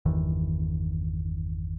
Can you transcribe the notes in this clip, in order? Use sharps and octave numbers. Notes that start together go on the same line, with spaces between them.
G1 E2 D#3 E3